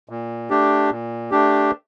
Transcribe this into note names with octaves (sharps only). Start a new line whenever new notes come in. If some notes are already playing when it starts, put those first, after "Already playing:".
A#2
A3 D4 G4
A#2
A3 D4 G4